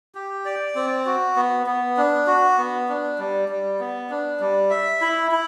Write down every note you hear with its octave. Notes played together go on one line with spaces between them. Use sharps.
G4
D5
C4
F#4
B3
B3
D4
F#4
B3
D4
G3
G3
B3
D4
G3
E5
E4
E4